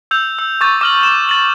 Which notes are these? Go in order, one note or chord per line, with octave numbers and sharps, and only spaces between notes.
E6 G6 F7
E6
C#6 D6 G6 A6
D6 F6 F#7
E7
A6 F#7